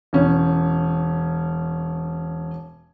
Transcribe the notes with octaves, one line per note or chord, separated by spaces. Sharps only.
E1 C#4